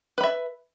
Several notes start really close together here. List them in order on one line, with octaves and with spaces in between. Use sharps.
B4 B5 E5